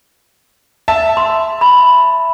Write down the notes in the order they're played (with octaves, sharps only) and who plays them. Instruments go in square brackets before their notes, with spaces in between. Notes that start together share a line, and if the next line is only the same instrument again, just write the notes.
[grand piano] E5 A5
[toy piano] C6
B5